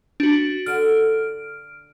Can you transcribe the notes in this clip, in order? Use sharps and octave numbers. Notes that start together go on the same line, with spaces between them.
D4 F#4
D3 F6 D7